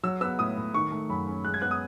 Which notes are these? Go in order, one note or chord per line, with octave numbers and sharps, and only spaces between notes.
F#3 E6
B3 E6
A2 D#6
A2
D#3 C#6
A3
F#2 B5
C#4
G#3 F#6
G#6
B3 F#6
D#6